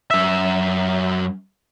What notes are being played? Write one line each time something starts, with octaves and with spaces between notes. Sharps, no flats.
F#2 E5